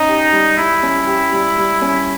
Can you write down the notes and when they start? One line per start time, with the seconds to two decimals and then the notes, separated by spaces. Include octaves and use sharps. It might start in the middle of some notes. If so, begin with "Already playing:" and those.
Already playing: C#4 D#4
0.08 G4
0.33 G3
0.58 G3 E4
0.83 C#4
1.07 G4
1.32 G3
1.57 G3
1.82 C#4